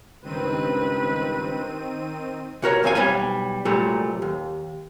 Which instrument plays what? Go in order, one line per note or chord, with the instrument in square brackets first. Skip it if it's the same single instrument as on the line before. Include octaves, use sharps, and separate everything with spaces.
[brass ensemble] C#2 G2 B4 [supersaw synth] D#3 C4 D#7
[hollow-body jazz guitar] C3 F#4 A#4 C#5
B1 E2 C4 E5 F5 G#5
B1 G3 C#5 G#5
C2 A#2 F#3 G3 A3
D#2